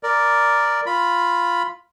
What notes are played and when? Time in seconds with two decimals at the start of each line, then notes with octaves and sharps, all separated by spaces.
0.03 A#4 D5
0.86 F4 B5